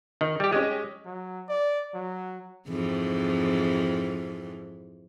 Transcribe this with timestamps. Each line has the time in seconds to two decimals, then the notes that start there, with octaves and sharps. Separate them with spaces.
0.21 D#3 D#4
0.40 G3 G4
0.52 G#3 C#4 G4 D#5
1.05 F#3
1.49 D5
1.94 F#3
2.68 F2 G#2 E3